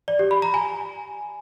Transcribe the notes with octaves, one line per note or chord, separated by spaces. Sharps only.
D5
G4
B5
A#5
G#5